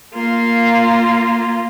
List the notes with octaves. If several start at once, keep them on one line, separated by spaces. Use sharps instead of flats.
A#3 F4